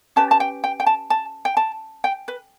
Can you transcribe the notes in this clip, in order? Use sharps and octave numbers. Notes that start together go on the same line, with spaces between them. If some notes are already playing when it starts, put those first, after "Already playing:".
C#4 G4 B4 A5
A5
G5
G5
G5
A5
A5
G5
A5
G5
B4